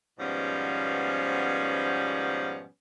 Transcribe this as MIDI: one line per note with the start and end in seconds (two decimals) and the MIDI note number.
0.19 2.66 44
0.19 2.66 47
0.19 2.66 53
0.19 2.66 55
0.19 2.66 59
0.19 2.66 61